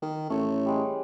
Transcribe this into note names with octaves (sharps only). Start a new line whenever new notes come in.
D#3
A1 A3 C#5
G3 G#3